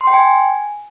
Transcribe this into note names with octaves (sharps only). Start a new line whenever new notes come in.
C6
G5
G#5